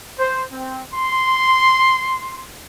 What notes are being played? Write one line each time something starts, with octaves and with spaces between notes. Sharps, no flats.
C5
C4
C6